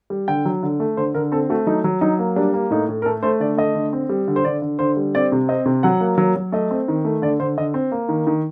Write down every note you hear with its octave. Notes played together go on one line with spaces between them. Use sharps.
G3
D3 G5
F#3
D3
A3
D3 C5
D3 A#4
C4 A4
A3 F#4
F#3 D#4
F#3
F#3 D#4
A#3
G3 D4
A#3
A2 D#4
A2
A#4
A3 A4
A3 C5
D3 D5
A3 D#5
D3
C4
G3
D3
C5
D3 D5
D3
D3 C5
G3
C4 D5
C3
C4 D#5
C3
F#3 F#5
A#3
F#3
F#3
A3 D#5
C4
D#3
A3
D3 D5
D3 C5
D3 D#5
C4
A#3
D#3
D#3